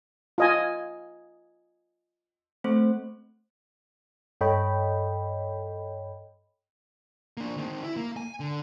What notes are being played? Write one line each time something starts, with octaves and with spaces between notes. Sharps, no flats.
F4 D#5 G#5
A3 C4 C5
G2 A4 C#5 D#5 G5 B5
A#3 D4
D#3 C4
E4
A#3
G#5
D3